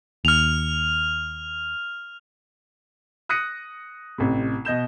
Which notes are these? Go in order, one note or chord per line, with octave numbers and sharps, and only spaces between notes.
D#2 F6 F7
D#6 F#6 A#6 C#7 D#7
A1 C3
B2 D#5 G6 E7